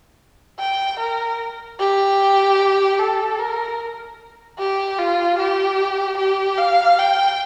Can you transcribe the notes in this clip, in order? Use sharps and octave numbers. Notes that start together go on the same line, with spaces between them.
G5
A#4
G4
A4
A#4
G4
F4
G4
G4
F5
G5